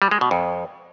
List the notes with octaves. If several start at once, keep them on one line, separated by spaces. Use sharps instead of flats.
G3
G#3
B2
F2